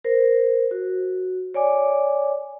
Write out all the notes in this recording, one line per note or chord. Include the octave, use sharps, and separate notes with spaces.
A#4 C5
F#4
C#5 D5 G#5 D6